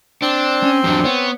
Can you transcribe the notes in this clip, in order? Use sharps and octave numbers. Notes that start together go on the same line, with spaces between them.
C4 D4
C#4
E2 F3 F#3 D4
B3 C#5